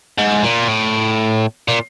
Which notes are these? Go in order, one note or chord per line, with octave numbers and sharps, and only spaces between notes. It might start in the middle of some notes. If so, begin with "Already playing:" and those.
G#2
A#2
A2
A#2